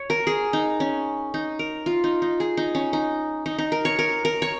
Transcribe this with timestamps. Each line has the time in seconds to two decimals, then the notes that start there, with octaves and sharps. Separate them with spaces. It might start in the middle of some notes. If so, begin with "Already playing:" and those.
Already playing: C#5
0.10 A#4
0.27 G#4
0.53 D#4
0.80 C#4
1.34 D#4
1.59 A#4
1.86 F4
2.04 D#4
2.22 D#4
2.40 G#4
2.57 D#4
2.75 C#4
2.93 D#4
3.46 D#4
3.58 D#4
3.72 A#4
3.85 C#5
3.99 A#4
4.25 A#4
4.42 C#5